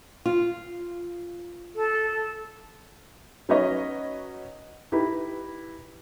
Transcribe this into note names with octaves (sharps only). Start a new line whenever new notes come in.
F4
A4
F#3 C#4 D#4 B4 C#5 D#5
D#4 E4 G4 B4